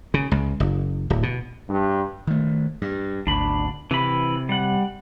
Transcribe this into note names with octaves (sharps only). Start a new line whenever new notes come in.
C#3
C#2
F#1
D1
B2
G2
D#3 A3
G2
G#1 D2 D4 B5
C3 E3 B5
G3 F#5